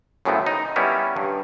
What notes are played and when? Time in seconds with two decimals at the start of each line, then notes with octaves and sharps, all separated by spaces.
0.25 F#2 A2 C#3 E3 B3 C4
0.47 D#4
0.76 G3 B3 C#4 E4 A#4
1.16 G2